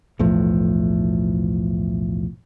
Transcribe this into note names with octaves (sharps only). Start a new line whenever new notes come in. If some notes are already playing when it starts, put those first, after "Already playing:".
B1 E2 A2 F3